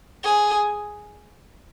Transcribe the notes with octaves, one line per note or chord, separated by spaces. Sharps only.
G#4